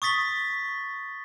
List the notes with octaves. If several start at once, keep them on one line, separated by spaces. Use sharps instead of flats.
C#6 D#6 A6 B6 G7